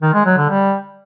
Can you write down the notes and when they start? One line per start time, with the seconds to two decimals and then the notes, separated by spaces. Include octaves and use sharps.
0.02 D#3
0.14 G#3
0.26 F#3
0.37 D3
0.49 G3